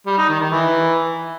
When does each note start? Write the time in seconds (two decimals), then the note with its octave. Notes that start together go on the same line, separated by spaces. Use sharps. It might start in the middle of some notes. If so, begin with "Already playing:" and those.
0.07 G3
0.18 D#4
0.29 D#3
0.40 D#3
0.51 E3